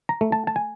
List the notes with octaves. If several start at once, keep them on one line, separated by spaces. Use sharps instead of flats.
A#5
A3
A5
A5
G#5